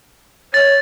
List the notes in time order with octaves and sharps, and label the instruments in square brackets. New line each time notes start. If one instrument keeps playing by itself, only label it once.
[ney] C#5 [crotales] A6